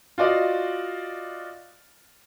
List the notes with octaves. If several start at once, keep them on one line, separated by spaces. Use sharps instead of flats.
F4 F#4 D5 D#5 F5